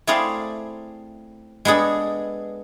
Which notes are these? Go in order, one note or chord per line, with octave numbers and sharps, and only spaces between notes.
A3 C4 E4 G#4 D5 F5
G#3 B3 D4 G#4 A4